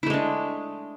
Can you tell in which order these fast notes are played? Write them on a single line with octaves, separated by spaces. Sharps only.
E4 A3 G#3 D4